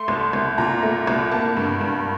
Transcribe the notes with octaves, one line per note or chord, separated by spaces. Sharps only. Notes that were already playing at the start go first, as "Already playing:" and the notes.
Already playing: A3 C6
C2
C2
A#2 A#5
A3
C2
A#3 A5
G2
G2